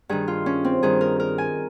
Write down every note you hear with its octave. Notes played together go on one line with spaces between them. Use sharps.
G2 D#3 G#4
F4
C#4
C4
G2 D#3 G#4
A#4
A#4
G#5